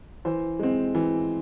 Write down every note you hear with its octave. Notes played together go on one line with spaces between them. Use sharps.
E3 C5
G#3 C4
E3